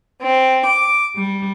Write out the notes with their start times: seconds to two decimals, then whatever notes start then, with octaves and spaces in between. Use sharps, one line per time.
0.21 C4
0.66 D6
1.15 G3